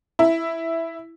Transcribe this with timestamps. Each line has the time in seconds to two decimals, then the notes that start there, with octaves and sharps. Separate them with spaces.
0.19 E4